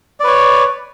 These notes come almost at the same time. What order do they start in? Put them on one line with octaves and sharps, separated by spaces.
D5 B4 C#5